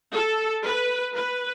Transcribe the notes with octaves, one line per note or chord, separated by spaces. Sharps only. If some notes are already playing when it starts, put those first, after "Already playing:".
A4
B4
B4